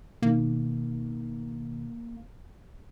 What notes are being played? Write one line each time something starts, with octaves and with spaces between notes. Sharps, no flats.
B2 D#3 A#3